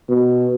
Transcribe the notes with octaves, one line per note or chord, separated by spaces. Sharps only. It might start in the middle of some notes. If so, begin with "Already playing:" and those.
B2